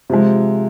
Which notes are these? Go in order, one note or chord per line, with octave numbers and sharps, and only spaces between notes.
C3 F3 G#3